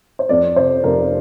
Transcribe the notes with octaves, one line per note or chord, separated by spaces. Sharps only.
C5
F2 D5
C3 C5
F1 A#4